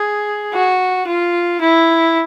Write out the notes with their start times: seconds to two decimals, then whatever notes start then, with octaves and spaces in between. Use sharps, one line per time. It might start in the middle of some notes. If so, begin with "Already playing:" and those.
Already playing: G#4
0.54 F#4
1.07 F4
1.61 E4